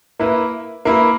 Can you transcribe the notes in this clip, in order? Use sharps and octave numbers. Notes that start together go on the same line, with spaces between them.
A#3 E4 B4
A#3 E4 B4